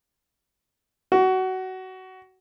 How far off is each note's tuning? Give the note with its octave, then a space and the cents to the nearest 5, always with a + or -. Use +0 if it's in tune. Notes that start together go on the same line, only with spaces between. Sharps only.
F#4 +20